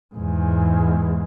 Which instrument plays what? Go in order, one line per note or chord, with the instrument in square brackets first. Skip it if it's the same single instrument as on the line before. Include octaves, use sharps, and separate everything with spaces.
[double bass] E2 G#2